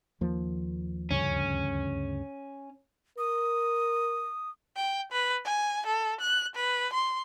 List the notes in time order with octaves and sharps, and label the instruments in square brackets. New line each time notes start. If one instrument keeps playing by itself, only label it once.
[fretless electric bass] D#2 F3 A#3
[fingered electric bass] D2 G2 C#3 [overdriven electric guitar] C#4
[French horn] A#4 [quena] D#6
[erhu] G5
B4
G#5
A4
F#6
B4
C6